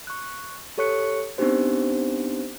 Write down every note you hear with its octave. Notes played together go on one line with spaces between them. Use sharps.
C#6 F#6
G4 A4 C#5 C#6 F#6 C#7
B3 C4 D4 D#4 G4 C5